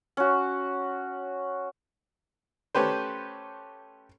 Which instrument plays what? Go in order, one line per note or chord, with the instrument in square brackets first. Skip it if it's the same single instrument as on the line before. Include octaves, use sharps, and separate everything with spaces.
[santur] C#4 F#4
[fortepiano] A3 C#4 G4 B4 C5